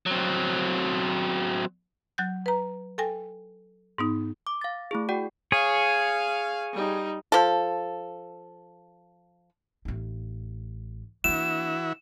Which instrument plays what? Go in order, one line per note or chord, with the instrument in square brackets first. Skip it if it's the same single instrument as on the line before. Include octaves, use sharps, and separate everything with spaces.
[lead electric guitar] F#3 C4
[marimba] F#3 F#6 G6
B4 A#5
A4 G5 G#5 A#6
G#2 B3 D#4
[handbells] D6
F5 A6
A3 E4 G#4
F#4 D5 F#5 G5
[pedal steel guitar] G#4 C#5 [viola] F5
[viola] G3 D#4
[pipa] F3 A4
[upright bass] A1 D#4
[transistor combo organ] E3 E4 F#4 [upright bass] A#3 D4 [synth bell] E7